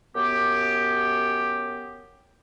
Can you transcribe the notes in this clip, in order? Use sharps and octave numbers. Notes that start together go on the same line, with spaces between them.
F#2 B3 G4